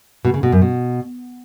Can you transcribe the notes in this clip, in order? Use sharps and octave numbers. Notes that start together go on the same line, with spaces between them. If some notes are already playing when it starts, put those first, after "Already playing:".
B2
C#3
B2
F#2
B2